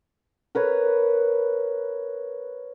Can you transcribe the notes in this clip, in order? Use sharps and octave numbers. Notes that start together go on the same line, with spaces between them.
A#4 B4 C#5